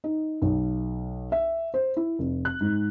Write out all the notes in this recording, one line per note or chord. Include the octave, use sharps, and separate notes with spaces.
D#4
B1
E5
C5
E4
F1
F#6
G#2